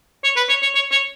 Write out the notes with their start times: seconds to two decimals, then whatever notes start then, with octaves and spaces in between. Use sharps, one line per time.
0.24 C#5
0.37 B4
0.49 C#5
0.63 C#5
0.75 C#5
0.92 C#5